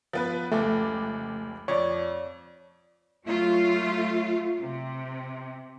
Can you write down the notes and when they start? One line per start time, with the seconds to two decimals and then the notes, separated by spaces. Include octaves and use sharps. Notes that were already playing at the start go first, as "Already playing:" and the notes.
0.13 F3 B3 B4
0.52 F1 C#2 A3 D6
1.68 F2 C#5 D5
3.24 F#3 A3 F4
4.61 C3